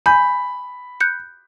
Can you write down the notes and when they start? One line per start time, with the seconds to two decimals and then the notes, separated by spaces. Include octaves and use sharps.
0.06 G#5 B5 G6
1.00 F#6 G6 C#7